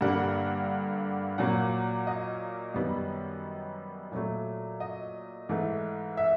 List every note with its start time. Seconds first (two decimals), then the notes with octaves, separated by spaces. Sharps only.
0.01 G2 D3 G3 A#3 F#5
1.38 A#2 F#3 A#3 F#5
2.07 D#5
2.74 F#2 D#3 G3 B3
4.12 A#2 F#3 A3
4.80 D#5
5.49 G#2 E3 A3
6.17 E5